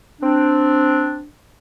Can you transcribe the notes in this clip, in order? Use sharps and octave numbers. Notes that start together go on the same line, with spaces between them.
C4 D4